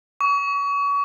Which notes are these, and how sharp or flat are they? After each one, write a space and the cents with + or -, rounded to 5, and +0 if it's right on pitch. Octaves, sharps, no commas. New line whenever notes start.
C#6 +35